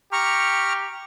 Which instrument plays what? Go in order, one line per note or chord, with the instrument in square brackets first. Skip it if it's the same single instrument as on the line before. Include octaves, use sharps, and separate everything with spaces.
[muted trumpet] G4 [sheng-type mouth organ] A#5 C#6 F6